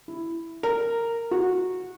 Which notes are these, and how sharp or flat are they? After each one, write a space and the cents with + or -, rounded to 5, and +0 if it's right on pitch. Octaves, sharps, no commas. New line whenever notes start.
E4 +5
A#4 -10
F#4 -15